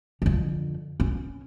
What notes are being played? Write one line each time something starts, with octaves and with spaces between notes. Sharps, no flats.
F2 D3
C#4